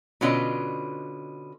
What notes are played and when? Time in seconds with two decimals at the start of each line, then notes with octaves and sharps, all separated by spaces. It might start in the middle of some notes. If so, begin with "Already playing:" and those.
0.21 B2 D3 C#4 F4 B4 D#5